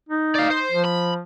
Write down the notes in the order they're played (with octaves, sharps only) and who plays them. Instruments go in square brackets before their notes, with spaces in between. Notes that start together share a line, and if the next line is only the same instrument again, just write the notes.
[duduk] D#4
[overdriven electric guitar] D5 F5
C5
[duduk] F3
[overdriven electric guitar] B5